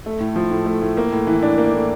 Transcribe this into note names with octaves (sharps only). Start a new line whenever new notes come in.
A3
A2
F3
A2
A3
A2
A#3
A2
E3
D4
A#3
A2